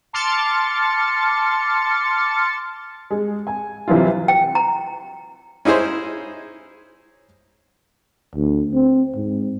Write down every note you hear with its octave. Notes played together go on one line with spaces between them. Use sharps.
A5 C6 D6 F6 A6 C#7
G#3
G#5
C3 E3 F#3 E4 F4
G5
A#5
C#4 D#4 E4 G#4 C5
D2
C4
G#2